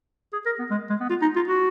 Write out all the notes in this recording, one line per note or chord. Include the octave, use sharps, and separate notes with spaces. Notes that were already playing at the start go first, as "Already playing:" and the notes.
G#4
A#4
B3
G#3
G#3
B3
F4
D#4
F4
F#4